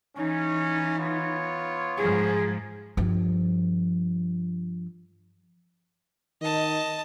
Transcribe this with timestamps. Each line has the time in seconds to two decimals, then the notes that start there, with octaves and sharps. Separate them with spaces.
0.17 E3 C#4 D#4
0.99 B3 F4 C#5
1.97 G#2 F3 G#4
2.97 G2 F3
6.42 D#3 D#5 A5